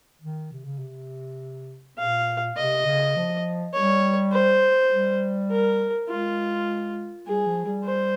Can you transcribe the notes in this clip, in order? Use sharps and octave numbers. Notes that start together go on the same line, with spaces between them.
D#3
C3
C#3
C3
A#2 F5
C3 D#5
C#3
F3
G3 C#5
C5
G3
A#4
G#3 F4
G3 G#4
F3
G3
C5